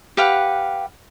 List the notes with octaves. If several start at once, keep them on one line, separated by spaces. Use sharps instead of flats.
G4 B4 F5 F#5